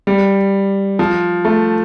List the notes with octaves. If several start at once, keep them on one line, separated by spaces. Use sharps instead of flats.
G3
F3
A3